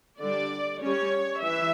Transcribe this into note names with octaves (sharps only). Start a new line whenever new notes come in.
D3 G3 D4 D5
G3 C#4 C#5
E3 E5